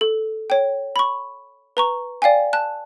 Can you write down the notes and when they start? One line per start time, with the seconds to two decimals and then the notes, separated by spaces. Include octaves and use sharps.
0.01 A4
0.50 C#5 G5
0.96 B5 C#6
1.77 B4 A#5 C#6
2.22 D5 F5 G5 G#5
2.53 A5 F#6